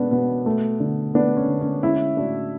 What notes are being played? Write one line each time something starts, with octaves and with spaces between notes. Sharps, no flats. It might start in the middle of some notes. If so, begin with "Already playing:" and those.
Already playing: B2 G#3 B3 C#4 D4
B2 B3
A3
D3
A3 B3 D4
C#4
D3
C#4
G#3 C#4 E4
A2 D4 F#4